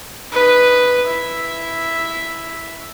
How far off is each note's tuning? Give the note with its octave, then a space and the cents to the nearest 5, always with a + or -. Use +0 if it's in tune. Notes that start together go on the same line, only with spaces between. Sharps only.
D#4 -10 B4 +0
E4 +0 E5 +0